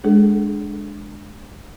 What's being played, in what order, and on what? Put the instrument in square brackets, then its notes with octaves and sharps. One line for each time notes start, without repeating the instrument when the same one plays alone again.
[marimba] G#3 D4 G#4 A4